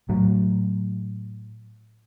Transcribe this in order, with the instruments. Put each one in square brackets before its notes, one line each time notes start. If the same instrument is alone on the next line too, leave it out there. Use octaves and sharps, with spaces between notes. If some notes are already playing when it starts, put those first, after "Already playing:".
[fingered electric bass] A2 F#3